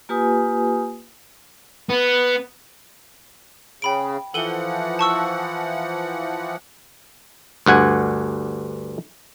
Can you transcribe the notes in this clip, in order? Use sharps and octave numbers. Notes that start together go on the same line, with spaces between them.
A#3 F4 G4 B4 G#5 D#6
B3
C#3 G5 B5 D7
E3 F3 A4 F#5 D#7 G7
A5 C#6 E6
D2 G2 F#5 G#5